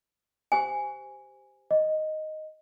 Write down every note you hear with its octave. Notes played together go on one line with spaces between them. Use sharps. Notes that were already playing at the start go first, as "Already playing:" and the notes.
G4 C5 G#5
D#5